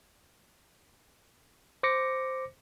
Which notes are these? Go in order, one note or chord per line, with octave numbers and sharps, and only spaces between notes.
C5 D6 A#6 C#7